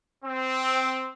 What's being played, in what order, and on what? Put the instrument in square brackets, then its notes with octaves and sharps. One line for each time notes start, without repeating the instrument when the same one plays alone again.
[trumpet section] C4